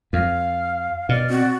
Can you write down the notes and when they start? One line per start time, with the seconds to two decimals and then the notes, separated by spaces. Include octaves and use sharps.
0.13 F2 F5 F6
1.09 B2 D5 F6
1.30 C4 F#4